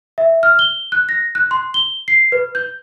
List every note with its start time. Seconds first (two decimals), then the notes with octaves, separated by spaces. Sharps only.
0.18 E5
0.43 F6
0.59 G7
0.92 F#6
1.09 A#6
1.35 F#6
1.51 C6
1.74 G7
2.08 C7
2.32 B4
2.55 G6